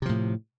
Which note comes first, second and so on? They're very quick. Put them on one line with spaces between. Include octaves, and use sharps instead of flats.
C3 F3 A2